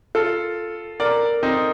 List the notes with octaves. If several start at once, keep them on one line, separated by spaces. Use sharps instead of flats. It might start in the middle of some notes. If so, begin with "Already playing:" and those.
F4 A4
A#4 D5
C4 D#4